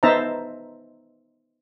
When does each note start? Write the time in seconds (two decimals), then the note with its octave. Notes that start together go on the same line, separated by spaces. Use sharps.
0.03 B3 D#4 C5 E5 A5 A#5